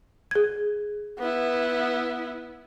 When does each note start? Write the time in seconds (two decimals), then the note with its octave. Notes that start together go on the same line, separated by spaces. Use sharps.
0.31 G#4 G#6
1.19 B3 E4